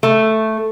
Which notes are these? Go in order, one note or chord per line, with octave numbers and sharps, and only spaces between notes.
A3